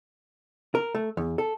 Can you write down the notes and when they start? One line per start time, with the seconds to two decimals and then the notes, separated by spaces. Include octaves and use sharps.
0.75 A#4
0.95 A3
1.17 E2
1.38 A4